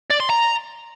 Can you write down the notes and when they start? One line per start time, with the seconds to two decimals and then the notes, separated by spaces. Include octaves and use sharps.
0.11 D5
0.20 C6
0.30 A#5